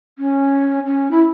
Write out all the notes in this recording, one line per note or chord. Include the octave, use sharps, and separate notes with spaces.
C#4
C#4
E4